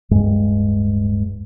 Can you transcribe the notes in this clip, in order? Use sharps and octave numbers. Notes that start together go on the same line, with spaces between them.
D1 G2 G#3